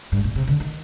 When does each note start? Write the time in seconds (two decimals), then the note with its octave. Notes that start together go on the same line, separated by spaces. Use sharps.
0.12 G2
0.24 A#2
0.36 C3
0.47 D3
0.60 D#3